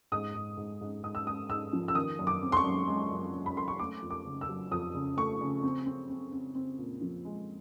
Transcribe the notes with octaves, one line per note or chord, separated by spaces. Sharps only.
G#2 D#6
G#2
G#2
G#2
G#2 D#6
E6
G#3 D#6
G#2 E6
F3
E6
D#3 D#6
F#2
D6
C4
C6
C#6
F#2
G#3
F#2
F#2
B5
F#2 C6
C#6
A3 D6
F2
D6
C#3
E6
F#3
F2 D#6
C#3
A3 C#6
C#3
C4
C4
C4
C4
C4
A#2
F3
G#3